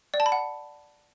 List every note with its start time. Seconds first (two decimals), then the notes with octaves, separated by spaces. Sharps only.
0.14 D5
0.20 A5
0.26 B5
0.32 F#5